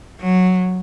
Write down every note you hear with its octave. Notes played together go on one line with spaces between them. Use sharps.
F#3